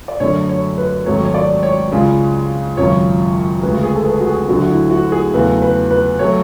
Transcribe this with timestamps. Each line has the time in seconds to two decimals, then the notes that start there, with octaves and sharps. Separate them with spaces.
0.08 D5
0.20 F#2 D3 F#3 A3 C#5
0.49 C#5
0.78 B4
1.06 G#1 G#2 F#3 A3 C#5
1.25 C#5
1.34 D5
1.63 C#5
1.91 C#2 C#3 G#3
2.77 G#1 F#2 C#3 C#5
3.63 D2 C#3 G#3 B4
3.83 G#4
3.95 A4
4.05 B4
4.20 F#4
4.27 G#4
4.48 D2 D3 F#3 A3 F#4
4.62 F#4
4.70 E4
4.90 F#4
5.12 G#4
5.34 E2 C#3 F#3 A3 B4
5.62 B4
5.91 B4
6.19 F#3 A3 C#5